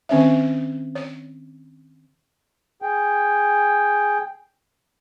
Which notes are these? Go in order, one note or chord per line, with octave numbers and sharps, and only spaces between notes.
D#3 C4 C#4 C#5 E5
C#5
G#4 G5